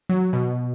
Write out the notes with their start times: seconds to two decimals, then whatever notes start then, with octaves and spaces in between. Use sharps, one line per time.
0.09 F#3
0.33 B2